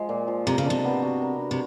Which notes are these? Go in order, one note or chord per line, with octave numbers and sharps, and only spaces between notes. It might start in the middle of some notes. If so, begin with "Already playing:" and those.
Already playing: F3 G#3
A#2
F3
C3 A#4
C#3
D4
C3
B3
F#4
A#4
D4
C3